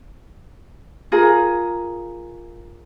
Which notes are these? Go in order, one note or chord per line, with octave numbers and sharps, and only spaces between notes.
F4 G#4 A#4